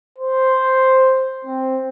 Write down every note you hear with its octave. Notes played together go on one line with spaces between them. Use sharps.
C5
C4